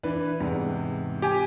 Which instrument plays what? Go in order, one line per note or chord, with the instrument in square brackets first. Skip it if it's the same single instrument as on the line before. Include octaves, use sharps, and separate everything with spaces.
[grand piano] E3 D4 B4
E2 G#2 C3
[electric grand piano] G4 G#5